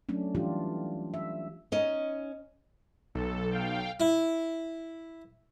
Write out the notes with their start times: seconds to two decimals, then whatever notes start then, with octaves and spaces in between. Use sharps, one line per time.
0.09 F#3 A3 C#4 D4
0.35 E3 G3 D4 F4 G4
1.14 E5
1.72 C#4 D#4 D#5
3.15 B1 A4
3.51 F5 G5
4.00 E4